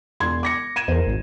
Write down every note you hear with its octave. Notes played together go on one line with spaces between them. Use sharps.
E1 C6 G#6
D6 A#6 C#7
G#6 D#7 E7
E2 A#4 C5
G#1